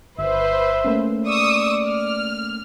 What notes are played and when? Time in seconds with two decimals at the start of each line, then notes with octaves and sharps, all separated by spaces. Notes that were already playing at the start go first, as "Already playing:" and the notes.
0.19 G1 B4 C5 E5
0.84 A3 A#3 C#4
1.26 D5 C#6 D#6 E6
1.87 F6